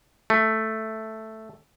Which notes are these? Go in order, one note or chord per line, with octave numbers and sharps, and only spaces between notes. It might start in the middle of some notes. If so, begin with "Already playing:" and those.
A3